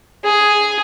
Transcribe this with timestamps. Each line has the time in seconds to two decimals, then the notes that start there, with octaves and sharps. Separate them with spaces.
0.24 G#4